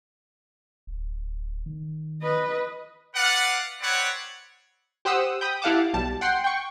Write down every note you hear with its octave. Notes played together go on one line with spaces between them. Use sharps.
D1
D#3
B4 D#5
B4 D5 F5 F#5
C4 B4 C#5 D5 F#5
G4 C5 F#5 D#6 E6
G5 B5 D#6
E4 G4 F5 F#5 A5 D6
B1 G3 A5
F#5 G5 C6
G5 C#6